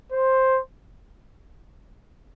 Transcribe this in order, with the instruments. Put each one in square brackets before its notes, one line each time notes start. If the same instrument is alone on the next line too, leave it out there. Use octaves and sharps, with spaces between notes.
[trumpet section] C5